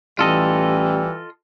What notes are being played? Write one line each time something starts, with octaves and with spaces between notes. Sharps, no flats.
A1 E3 G3 F4 A4 D#5